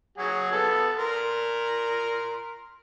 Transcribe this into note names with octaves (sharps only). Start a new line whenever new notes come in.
F#3 F#4 G#4
B3 A4
A#4 C6